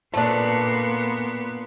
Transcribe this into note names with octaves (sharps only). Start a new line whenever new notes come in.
A#2 A3 B3 D4